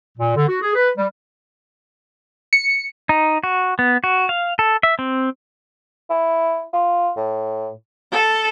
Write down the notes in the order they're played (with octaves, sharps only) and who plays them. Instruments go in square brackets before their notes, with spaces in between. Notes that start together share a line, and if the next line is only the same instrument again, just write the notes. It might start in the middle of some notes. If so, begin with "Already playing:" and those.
[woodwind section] A#2
D3
F#4
G#4
B4
G3
[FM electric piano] C#7
[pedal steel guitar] D#4
F#4
B3
F#4
F5
A4
E5
C4
[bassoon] E4
F4
A2
[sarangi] A4